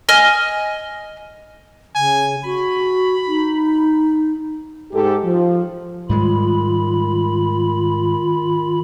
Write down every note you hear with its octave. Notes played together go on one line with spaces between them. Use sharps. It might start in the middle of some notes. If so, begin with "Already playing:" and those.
D#5 G#5 F6
C#3 G#5
F#4 B5
D#4
G#2 G4 A4
F3
G#2 D#3 G3 G#3 F4 B5